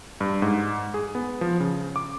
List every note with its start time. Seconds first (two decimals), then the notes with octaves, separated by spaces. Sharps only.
0.21 G2
0.42 G#2
0.94 G#4
1.15 B3
1.41 F3
1.60 C#3
1.96 D6